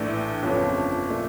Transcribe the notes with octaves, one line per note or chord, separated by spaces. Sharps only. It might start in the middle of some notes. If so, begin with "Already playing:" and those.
Already playing: A#1 A2 E3 A3 D4
G1 F2 C#3 F3 C#4
A#2 A3 D4